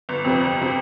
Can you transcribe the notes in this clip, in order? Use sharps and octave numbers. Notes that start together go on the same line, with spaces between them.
G1
F2 C3
G1
C3